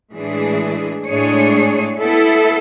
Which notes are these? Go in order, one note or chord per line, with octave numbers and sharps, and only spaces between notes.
A2 E3 G#3 D4 G#4
A2 G#3 D4 G#4 C#5
B3 E4 A4